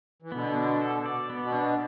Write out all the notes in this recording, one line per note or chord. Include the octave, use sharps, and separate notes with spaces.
E3
B2 D3 B3
D4
A4
D5
B3
B2
D4